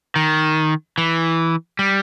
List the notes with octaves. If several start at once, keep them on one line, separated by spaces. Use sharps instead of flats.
D#3
E3
G3